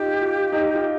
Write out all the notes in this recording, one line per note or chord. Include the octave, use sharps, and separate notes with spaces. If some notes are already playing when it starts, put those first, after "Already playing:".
Already playing: D#4 F4 G4
F4
D#4
F4